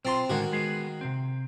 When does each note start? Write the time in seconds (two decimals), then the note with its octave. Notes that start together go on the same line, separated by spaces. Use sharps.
0.05 B1 C4 F4 A#5 C6
0.29 A2 D3 D#3 G#3 F#4
0.53 G#3 B3 G#4
1.01 C3 C4